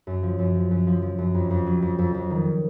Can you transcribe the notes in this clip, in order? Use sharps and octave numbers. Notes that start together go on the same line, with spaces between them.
F#2
F3
F#2
F3
F#2
F3
F3
F#2
F2
F2
F#3
F2
F2
F2
D#3